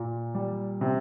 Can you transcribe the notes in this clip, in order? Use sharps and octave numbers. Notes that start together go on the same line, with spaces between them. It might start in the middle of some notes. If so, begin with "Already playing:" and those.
Already playing: A#2
G3
C3